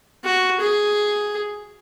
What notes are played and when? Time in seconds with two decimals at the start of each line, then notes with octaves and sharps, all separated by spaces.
0.24 F#4
0.60 G#4